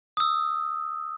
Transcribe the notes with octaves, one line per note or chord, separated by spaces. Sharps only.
D#6
E6